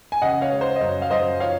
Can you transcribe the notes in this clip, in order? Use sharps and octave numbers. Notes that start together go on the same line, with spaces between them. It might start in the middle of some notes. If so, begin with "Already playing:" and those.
G#5
C#3 D#5 F#5
C#5 F5
G#3
C5
D#5
F#2 C#5
F5
F#2 C5 D#5
F3 C#5 F5